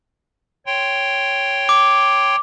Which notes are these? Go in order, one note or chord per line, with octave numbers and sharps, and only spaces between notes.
C#5 G5 C6
D6